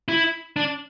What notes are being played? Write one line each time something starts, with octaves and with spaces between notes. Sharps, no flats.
E4
D4